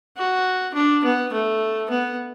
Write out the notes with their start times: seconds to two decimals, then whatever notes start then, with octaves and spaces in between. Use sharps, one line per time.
0.16 F#4
0.74 D4
1.04 B3
1.32 A3
1.90 B3